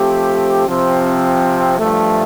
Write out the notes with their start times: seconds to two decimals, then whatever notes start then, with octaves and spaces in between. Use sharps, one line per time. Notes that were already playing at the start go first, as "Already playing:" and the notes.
Already playing: F3 A3 C4 G4
0.68 C3 F3 C4
1.79 G2 F3 A3